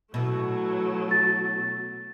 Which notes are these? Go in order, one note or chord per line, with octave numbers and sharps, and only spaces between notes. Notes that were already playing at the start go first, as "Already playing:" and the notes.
B2 E3 F#3 A3
A6